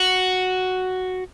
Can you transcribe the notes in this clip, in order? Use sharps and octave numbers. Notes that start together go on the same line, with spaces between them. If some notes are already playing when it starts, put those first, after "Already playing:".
Already playing: F#4